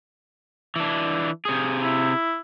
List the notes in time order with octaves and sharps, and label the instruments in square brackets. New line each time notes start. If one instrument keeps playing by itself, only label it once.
[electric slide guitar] E3 D4
C3 G#4
[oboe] E4